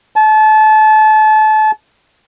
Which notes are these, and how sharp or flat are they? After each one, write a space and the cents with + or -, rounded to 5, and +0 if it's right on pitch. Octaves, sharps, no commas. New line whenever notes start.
A5 -30